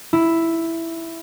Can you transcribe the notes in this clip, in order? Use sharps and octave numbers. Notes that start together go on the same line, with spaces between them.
E4